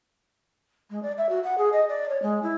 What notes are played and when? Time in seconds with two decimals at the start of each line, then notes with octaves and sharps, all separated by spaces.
0.90 G#3
1.02 D5
1.17 E5
1.29 F#4
1.43 F#5
1.58 G#4
1.72 D#5
1.88 D5
2.09 C#5
2.22 G#3
2.42 E4